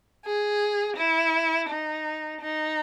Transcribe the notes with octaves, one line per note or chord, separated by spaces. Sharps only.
G#4
E4
D#4
D#4